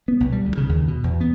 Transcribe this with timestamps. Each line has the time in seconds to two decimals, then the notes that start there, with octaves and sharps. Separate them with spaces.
0.08 B3
0.20 B1
0.32 G3
0.45 D2
0.57 C#3
0.69 D#2
0.88 B2
1.04 E2
1.21 B3